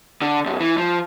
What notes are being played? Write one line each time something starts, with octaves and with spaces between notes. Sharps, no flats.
D3
B1 F#2
E3
F3